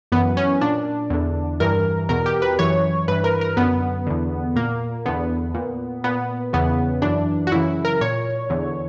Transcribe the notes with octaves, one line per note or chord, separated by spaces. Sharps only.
F#2 E3 B3
C#4
A#2 D4
E2 D3
G2 E3 A#4
E2 B2 A#4
G4
B4
F#2 E3 C#5
G2 E3 B4
A#4
A#4
F#2 D3 B3
E2 D3
A#2 A#3
E2 D3 B3
A#2
A#2 B3
E2 C#3 E3 B3
F#2 E3 D4
F#4
F#2 C#3 E3 E4
A#4
A#2 C#5
E2 D3